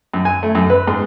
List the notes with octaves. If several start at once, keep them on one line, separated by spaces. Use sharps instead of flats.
F#2
G#5
A3
F#2
B4
G#2